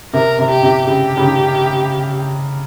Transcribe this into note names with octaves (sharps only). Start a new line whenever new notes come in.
C3 A#4
C3
G4
C3
C#3 G4
C#3
D#3